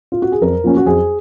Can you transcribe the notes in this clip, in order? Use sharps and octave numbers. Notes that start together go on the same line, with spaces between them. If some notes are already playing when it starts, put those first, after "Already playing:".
F4
F#4
G#4
F2 A#4
F3 A#3 C#4
F#4
F2 G#4